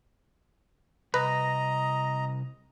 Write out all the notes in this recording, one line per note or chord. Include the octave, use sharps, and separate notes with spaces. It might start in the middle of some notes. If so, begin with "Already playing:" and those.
C2 B4 D#5 A#5